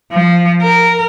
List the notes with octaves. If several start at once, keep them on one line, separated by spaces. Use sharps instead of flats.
F3
A#4